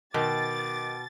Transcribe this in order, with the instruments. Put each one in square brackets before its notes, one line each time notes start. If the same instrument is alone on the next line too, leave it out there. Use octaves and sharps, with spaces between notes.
[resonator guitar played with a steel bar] B2 [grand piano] D#3 [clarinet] D6 [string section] A6